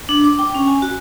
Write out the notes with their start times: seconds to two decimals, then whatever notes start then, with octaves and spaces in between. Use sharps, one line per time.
0.09 D4
0.24 D6
0.39 G5
0.55 C#4
0.67 G#5
0.82 F#4